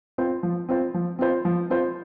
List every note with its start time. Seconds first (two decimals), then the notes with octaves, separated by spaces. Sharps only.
0.18 C4 F4 C5
0.43 F3
0.69 C4 F4 C5
0.94 F3
1.19 C4 F4 C5
1.45 F3
1.70 C4 F4 C5